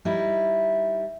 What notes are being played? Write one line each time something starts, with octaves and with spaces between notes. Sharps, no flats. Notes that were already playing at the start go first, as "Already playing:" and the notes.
G3 D#4 E4